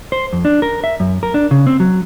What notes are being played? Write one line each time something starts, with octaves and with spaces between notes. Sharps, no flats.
C5
F2
D4
A#4
E5
F#2
A#4
D4
C#3
C4
F#3